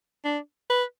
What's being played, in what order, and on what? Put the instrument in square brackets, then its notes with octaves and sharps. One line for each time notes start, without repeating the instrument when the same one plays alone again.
[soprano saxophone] D4
B4